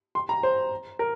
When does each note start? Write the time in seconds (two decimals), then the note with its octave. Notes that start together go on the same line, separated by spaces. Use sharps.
0.15 C6
0.29 A#5
0.43 C5
0.99 A#4